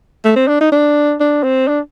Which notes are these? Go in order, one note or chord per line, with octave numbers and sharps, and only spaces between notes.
A3
C4
D4
D#4
D4
D4
C4
D4